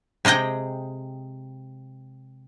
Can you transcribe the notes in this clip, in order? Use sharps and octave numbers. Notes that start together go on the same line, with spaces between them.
C3 G#3 G#4 D#5 G5